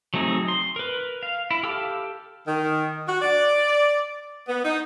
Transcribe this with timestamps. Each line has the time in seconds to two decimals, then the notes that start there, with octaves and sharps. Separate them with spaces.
0.14 F#3 A3 C4 D#4 G#4
0.48 C6
0.76 A#4 B4
1.23 F5
1.51 E4
1.63 G4 A4 F5 E6
2.47 D#3
3.07 F#4
3.22 D5
4.48 B3
4.64 D#4